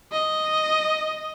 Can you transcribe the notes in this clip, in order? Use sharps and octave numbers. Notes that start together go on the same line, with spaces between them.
D#5